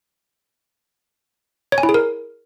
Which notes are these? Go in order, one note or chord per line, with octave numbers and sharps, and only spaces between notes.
C#5
G#5
E4
G#4
A#4